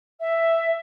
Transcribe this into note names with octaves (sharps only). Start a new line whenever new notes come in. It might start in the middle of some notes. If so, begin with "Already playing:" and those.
E5